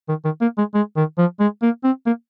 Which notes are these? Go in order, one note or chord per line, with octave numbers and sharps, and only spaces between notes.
D#3
D#3
A#3
G#3
G#3
D#3
F3
G#3
A#3
C4
A#3